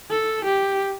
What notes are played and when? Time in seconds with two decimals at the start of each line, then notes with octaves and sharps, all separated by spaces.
0.10 A4
0.44 G4